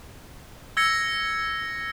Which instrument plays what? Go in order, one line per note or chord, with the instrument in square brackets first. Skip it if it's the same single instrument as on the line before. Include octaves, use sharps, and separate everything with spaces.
[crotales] E6 G#6 A#6 C#7